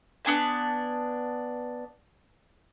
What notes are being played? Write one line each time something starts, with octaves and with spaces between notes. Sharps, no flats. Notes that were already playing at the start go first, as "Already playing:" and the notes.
B3 D4 G#5 A5